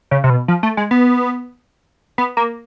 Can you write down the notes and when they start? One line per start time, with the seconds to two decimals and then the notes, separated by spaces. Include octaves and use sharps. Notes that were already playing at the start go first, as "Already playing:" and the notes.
0.11 C#3
0.24 C3
0.30 B2
0.48 F3
0.63 A3
0.77 G#3
0.91 B3
2.18 B3
2.37 A#3